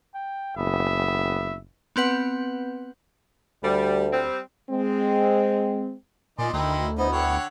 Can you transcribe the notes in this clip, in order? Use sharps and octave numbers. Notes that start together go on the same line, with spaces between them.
G5
F#1 B3 E5
B3 C4 B4 F#5
D2 G3
G3 C4
G#3 C4
A#2 D#3 D#4 D5 G#5 C6
D2 D#3 D#4 E4 G5
B3 D#4 E4 C5
D3 C#5 F#5 G5